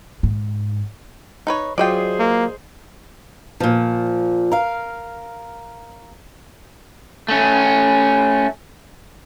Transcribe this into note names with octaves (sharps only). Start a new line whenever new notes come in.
G#2
D#4 B4 C#5
F#3 F4 G#4 C5 D5 D#5 G5
A#3
A#2 F3
A#4 F5
A3 C#4